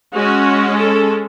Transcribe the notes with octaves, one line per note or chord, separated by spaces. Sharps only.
G#3 C#4 F#4
A4